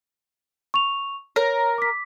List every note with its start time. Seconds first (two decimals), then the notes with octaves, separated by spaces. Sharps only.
0.74 C#6 F7
1.36 A#4 C#5
1.78 D6 B6